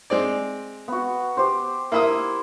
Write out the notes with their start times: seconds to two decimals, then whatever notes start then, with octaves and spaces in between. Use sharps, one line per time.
0.10 G#3 C4 D5
0.88 B3 F#4
1.37 G4 C5
1.92 A#3 E4 E5 D#6